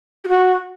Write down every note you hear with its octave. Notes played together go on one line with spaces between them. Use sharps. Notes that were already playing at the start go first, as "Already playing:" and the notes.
G4
F#4